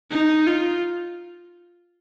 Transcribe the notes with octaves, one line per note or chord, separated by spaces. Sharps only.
D#4
F4